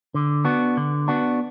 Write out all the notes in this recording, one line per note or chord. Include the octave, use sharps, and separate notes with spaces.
D3
B3 D4 F#4
D3
B3 D4 F#4